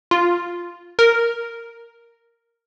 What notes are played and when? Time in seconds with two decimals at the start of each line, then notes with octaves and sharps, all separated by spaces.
0.11 F4
0.99 A#4